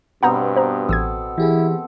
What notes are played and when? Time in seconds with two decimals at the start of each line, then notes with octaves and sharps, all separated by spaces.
0.23 G2 B2 B3 C4 F#5 A#5 G6
0.56 C5 A#5
0.89 A1 A4 D#6 G#6
1.38 E3 E4 G4 G#4